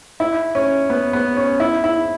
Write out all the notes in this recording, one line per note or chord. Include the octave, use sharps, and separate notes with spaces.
E4
C#4
B3
B3
C#4
E4
E4